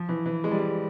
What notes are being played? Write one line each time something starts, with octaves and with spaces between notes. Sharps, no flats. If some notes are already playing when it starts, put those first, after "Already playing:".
Already playing: F3
E3
E3
G#3
G3
G#3